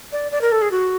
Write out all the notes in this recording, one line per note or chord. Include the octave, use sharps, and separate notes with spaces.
D5
D5
A#4
A4
G#4
F#4